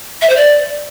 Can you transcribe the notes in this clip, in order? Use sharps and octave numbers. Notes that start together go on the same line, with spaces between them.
E5
C5
D5